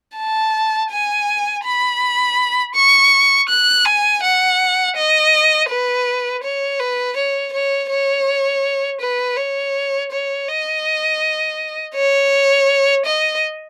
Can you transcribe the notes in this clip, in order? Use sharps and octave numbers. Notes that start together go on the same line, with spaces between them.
A5
G#5
B5
C#6
F#6
G#5
F#5
D#5
B4
C#5
B4
C#5
C#5
C#5
B4
C#5
C#5
D#5
C#5
D#5